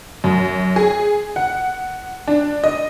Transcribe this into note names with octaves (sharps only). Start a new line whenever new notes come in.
F#2
G#4
F#5
D4
D#5